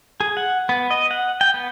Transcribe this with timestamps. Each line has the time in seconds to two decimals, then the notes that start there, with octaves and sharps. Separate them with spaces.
0.20 G#4
0.37 F#5
0.69 B3
0.90 D#5
1.11 F#5
1.41 G5
1.54 B3